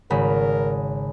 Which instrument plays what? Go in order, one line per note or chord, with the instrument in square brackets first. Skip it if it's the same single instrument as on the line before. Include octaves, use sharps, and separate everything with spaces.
[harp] G#1 C#3 B5 [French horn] A#4